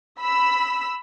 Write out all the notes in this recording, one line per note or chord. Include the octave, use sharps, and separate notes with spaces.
B5 E6 B6